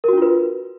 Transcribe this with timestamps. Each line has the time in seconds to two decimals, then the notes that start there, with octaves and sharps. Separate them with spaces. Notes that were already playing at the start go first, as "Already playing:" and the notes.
0.04 A#4
0.08 F#4
0.13 D4
0.18 F4
0.22 B4